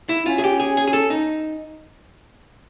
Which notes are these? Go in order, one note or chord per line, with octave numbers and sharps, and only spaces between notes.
E4
C#4 F4
G#4
G4
G#4
G#4
G#4
A4
D#4